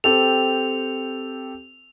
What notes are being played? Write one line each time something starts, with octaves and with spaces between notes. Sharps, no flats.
C4 G4 A4 F7